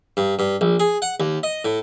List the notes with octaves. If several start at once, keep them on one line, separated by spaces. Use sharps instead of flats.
G2
G2
A#1
G#4
F#5
D#2
D#5
A2